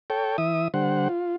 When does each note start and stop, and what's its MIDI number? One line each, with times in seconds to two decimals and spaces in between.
0.10 0.37 69
0.10 0.37 73
0.10 0.37 79
0.38 0.68 52
0.38 0.68 76
0.38 0.68 87
0.74 1.08 50
0.74 1.08 55
0.74 1.08 72
0.74 1.08 78
1.09 1.36 65